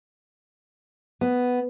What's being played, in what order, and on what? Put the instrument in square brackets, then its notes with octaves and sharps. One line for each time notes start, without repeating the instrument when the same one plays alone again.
[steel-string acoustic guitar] B3